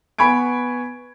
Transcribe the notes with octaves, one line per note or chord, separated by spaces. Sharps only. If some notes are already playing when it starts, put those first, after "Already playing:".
B3 G#5 B5 C#6 G#6 D7